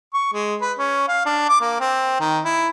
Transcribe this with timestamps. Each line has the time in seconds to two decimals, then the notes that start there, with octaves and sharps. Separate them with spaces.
0.14 C#6
0.33 G#3
0.61 B4
0.79 C#4
1.08 F5
1.26 D4
1.49 D6
1.61 A#3
1.80 C4
2.20 D#3
2.45 E4